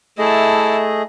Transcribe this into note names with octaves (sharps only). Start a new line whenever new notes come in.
A3 E4 G#4 D#5 A5